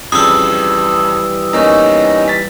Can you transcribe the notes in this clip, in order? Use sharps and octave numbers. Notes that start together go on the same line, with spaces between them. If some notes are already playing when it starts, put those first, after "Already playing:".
F2 C#3 E3 G3 D#6 E6
E2 A#3 C#4 D#4 A#5
A6 B6